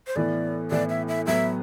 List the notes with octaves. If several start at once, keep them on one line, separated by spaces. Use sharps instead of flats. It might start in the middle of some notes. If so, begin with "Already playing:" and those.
C5
A2 E3 B3 E4 D5
A2 E3 B3 E4 D5
E5
E5
A2 F#3 B3 E5